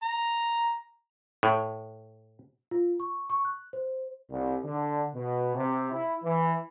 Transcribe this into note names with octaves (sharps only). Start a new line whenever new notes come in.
A#5
A2
F4
C#6
C#6
F#6
C5
C2
D3
B2
C3
E4
E3